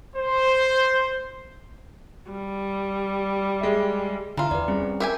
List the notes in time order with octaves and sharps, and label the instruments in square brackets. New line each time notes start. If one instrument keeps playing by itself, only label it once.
[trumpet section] C5
[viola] G3
[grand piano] G#3 E5
[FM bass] D3 [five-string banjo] E3 F4 [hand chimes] A#5
[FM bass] E2 [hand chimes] B4 D5
[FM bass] G3 [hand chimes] C4 C#4 G#4
[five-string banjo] G4 E5 G#5 [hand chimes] A#4